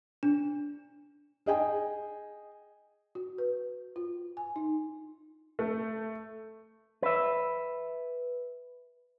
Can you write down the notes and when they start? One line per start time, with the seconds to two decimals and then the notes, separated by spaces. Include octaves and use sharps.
0.23 D4
1.46 G#4 D#5 G5 G#5
3.15 F#4
3.38 B4
3.96 F4
4.37 G#5
4.56 D#4
5.59 A3
7.02 B4 E5